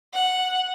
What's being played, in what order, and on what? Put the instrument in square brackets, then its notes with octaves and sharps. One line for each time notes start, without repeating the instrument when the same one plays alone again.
[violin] F#5